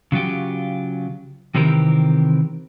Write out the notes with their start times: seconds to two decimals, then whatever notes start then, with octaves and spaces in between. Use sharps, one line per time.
0.12 C#3 F#3 F4 G4
1.55 C3 D#3 E3 C4 G4 A#4